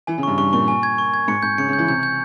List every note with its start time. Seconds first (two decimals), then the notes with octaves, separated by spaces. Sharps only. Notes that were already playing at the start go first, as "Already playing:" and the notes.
0.07 E3 G#5
0.18 C#3
0.23 G2 C#6
0.38 G2 C#6
0.53 A#2 C#6
0.68 G#5
0.83 G#6
0.98 C#6
1.14 G#6
1.28 G#2 C#7
1.43 G#2 G6
1.58 C#3 C#7
1.68 C#3
1.73 G6
1.79 E3
1.88 C3 G6
2.03 G6